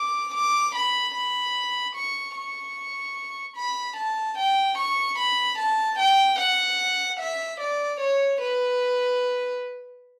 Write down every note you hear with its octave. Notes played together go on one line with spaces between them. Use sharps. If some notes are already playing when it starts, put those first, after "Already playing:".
Already playing: D6
D6
B5
B5
C#6
C#6
B5
A5
G5
C#6
B5
A5
G5
F#5
E5
D5
C#5
B4